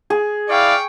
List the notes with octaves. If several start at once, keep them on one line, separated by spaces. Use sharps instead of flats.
G#4
E4 D5 F5 G5 C#6